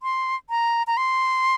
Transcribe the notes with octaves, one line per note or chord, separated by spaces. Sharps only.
C6
A#5
A#5
C6